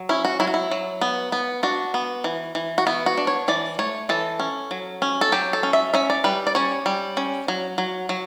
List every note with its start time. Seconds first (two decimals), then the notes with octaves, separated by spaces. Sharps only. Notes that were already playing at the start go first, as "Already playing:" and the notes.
Already playing: F#3
0.09 C#4 E4
0.25 F#4
0.40 F#3 E4
0.47 F#4
0.54 E4
0.71 F#3
1.01 B3
1.32 B3
1.63 D4 F#4
1.94 B3
2.24 E3
2.55 E3
2.78 F#4
2.87 B3 E4
3.06 F#4
3.17 D4
3.27 C#5
3.48 E3 D5
3.79 A3 C#5
4.09 E3 A4
4.40 C#4
4.71 F#3
5.02 C#4
5.21 A4
5.32 F#3 G4
5.53 A4
5.63 C#4
5.73 E5
5.94 C#4 E5
6.10 D5
6.24 G3 B4
6.47 D5
6.55 C#4 C#5
6.86 G3
7.17 C#4
7.48 F#3
7.78 F#3
8.09 F#3